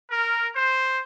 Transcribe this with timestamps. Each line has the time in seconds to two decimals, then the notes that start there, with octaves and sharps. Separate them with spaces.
0.11 A#4
0.54 C5